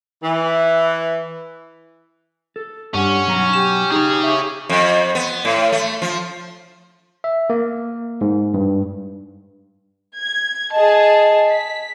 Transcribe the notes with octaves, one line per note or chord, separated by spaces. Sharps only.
E3
A4
G2 G3 C#4 F#5
B1 F#3 A#5
G4 E7
D#4 G#4 C#5
E5
F2
B3
A2
A3
F3
E5
A#3
G#2
G2
G#6
G#4 D#5 A5
B6